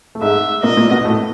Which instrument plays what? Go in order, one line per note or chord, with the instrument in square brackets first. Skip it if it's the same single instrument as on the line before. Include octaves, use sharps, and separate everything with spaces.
[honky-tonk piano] A3
[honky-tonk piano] G#2 G#3 [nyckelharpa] E5
[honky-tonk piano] A#2 A#3 [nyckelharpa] D#5
[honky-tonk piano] A#2 A#3
B2 B3
A2 A3